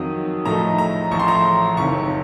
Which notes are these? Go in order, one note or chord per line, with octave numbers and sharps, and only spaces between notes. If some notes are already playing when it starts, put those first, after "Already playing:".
Already playing: F2 D#3 F#3 D#6
A2 F3 A3 D#4 A#5
A#5
A1 A2 F3 C#6
C6
A#5
C6
F#1 F2 D#3 C#6